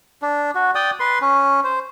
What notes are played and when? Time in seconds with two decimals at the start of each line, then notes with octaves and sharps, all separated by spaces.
0.22 D4
0.55 F#4
0.75 D5 G5 D#6
1.00 B4 C6
1.21 C#4
1.64 C5